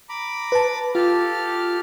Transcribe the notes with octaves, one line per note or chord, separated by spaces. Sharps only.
A#5 B5 D6
B4 A5
F4 G4 A4 F6